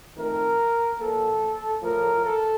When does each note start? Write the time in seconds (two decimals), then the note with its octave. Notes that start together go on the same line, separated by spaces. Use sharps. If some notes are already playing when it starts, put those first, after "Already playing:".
0.15 F2 D#3 A3 A#4
0.98 A#2 F3 A#3 A4
1.82 A2 F3 A3 A#4
2.24 A4